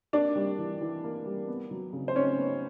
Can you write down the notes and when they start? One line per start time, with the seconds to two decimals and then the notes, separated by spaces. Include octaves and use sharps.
0.13 A#3 D4 D5
0.35 G3
0.58 E3
0.81 E3
1.04 A#3
1.26 G3
1.48 B3
1.71 F#3
1.93 C#3
2.08 C5
2.15 C#4 D#4 C#5
2.38 B3